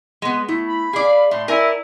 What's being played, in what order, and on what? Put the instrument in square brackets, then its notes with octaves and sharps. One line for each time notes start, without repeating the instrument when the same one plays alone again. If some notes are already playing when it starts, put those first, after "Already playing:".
[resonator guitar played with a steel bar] G#3 B3
[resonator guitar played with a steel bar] A3 [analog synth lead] E4
[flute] B5
[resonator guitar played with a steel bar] G#4 D5 [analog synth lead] F5
[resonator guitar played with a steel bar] A2 [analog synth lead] C6
[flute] E4 [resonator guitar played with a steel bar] A#4 G#5 [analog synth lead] D5